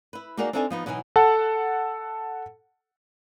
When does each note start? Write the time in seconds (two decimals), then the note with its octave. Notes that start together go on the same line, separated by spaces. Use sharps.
0.13 E4 B4
0.37 A#3 D#4 F#4 G#4 A#4 D5
0.53 C4 D4 D#4 A4 E5 G#5
0.70 F3 B3 D#4
0.86 B2 E3 F#3 B3 D#4 G#5
1.16 A4 F#5 A5